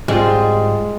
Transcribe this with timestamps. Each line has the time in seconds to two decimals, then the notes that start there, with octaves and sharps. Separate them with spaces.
0.08 G#2 G3 G#3 C4 F4